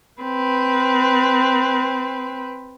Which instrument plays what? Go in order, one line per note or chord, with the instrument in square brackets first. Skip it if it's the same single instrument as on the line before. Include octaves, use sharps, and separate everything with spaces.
[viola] C4 B4